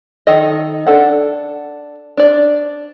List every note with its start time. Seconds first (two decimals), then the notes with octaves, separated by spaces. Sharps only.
0.27 D#3 A4 D#5
0.87 D4 A4 F#5
2.17 D4 D5